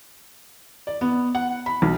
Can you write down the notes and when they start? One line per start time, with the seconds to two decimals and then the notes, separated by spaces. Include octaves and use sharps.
0.87 D5
1.01 B3
1.35 F#5
1.66 B5
1.82 B1